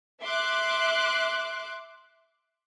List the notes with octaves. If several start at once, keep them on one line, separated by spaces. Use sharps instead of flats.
E5 C6 D6 F#6